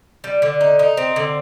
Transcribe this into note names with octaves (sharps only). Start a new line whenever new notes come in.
G3
D3
D#4
D#4
C4
D3